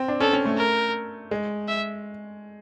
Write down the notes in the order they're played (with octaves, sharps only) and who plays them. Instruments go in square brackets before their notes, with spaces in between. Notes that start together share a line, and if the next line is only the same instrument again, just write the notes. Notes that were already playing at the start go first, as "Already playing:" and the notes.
Already playing: [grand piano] C4
D4
[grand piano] C#4 [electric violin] A4
[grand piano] C#4
A3
[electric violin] A#4
[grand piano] G#3
[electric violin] E5